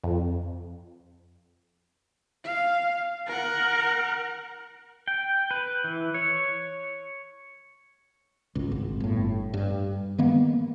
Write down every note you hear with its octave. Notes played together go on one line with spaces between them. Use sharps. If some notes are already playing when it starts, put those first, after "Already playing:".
F2
F5
A#4 F#5
G5
B4
E3
C#5
G#1 C#2
G#1
G1 A2
G2
D#3 G#3 A#3 B3